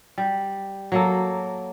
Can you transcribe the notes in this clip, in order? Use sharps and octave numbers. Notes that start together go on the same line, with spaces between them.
G3
F#3 A#3 A4